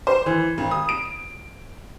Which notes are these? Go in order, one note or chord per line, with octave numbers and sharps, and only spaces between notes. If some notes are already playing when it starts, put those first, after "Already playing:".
C5
E3
G#1
D#6
D7